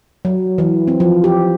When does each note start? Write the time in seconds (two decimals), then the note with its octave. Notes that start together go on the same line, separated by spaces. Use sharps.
0.25 F#3
0.58 E3
0.88 C4
1.00 F3
1.24 G4